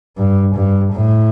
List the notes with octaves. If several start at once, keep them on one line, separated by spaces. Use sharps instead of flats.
G2
G2
A2